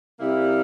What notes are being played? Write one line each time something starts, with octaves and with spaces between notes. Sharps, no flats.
C3 G3 A#3 E4